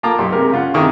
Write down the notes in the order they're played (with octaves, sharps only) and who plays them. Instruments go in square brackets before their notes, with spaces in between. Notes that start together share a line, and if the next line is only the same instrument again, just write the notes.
[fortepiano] A#3 F4 A5 A#5 D6
B1 G4 C6
C3 G#3 G4 A#4
C#3 F4 F#5
C3 D#3 E4 G#4 C#6